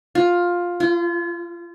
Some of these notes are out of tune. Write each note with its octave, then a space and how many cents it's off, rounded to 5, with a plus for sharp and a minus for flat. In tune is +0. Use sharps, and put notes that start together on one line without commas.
F4 +10
F4 -30